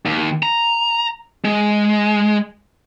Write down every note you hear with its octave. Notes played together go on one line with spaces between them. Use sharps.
D#2
A#5
G#3